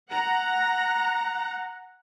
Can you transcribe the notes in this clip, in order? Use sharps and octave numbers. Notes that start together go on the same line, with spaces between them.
F#5 A#5